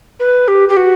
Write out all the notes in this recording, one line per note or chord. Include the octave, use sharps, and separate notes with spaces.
B4
G4
G4
F#4